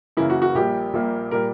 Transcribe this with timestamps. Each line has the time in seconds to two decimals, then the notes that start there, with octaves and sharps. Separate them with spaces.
0.17 F#2 C#3 E3 A#3 E4
0.30 F#4
0.42 F#4
0.55 A#1 A#2 G3 A#3 G4
0.93 A#1 A#2 G3 A#3
1.31 A#2 G3 A#3 A#4